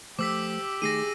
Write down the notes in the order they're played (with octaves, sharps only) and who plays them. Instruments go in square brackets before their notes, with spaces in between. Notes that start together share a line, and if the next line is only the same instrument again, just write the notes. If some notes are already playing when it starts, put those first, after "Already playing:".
[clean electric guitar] F3 A3 C5 [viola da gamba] G4 [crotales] D6 E6 B6
[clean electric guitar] D#3 A3 D#4 [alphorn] G#4 [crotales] A#6 C7 D#7